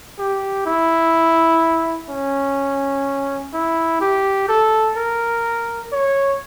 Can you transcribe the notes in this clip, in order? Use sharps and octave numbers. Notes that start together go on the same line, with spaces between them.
G4
E4
C#4
E4
G4
A4
A#4
C#5